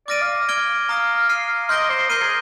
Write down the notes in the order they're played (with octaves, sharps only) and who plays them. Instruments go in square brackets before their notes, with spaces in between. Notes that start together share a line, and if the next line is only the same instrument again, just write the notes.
[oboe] D5 [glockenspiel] D6 F6 A#6 D#7
[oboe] F5
[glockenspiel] F6 G#6 D7 G7
[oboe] F5 [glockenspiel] A#5 D#6 A#6
[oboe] F5 [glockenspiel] F6 C7 D#7
[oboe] D#5 [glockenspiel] C6 G6 A#6 D7 G7
[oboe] C5
[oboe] A#4 [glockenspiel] G6 C7 D#7 G7
[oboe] G#4